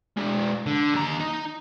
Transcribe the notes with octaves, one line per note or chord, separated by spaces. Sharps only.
G#3 D4
D3
D#2 A#5
D#4